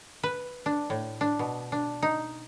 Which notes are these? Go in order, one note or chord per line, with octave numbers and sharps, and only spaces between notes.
B4
D4
A2
D4
B2
D4
D#4